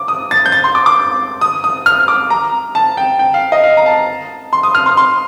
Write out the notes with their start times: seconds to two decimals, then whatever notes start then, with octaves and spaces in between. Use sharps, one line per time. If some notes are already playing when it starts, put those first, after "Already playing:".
Already playing: D6
0.08 D#6
0.31 A6
0.46 G6
0.52 A6
0.64 C6
0.75 D6
0.86 D6
1.41 D#6
1.64 D#6
1.86 F6
2.08 D6
2.30 A#5
2.75 A5
2.97 G5
3.19 G5
3.34 F5
3.52 D#5
3.64 F5
3.77 A#5
3.86 A5
4.53 C6
4.63 D#6
4.75 F6
4.86 C6
4.97 C6